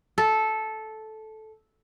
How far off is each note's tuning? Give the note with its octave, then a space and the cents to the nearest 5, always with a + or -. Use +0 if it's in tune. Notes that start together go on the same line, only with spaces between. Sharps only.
A4 -10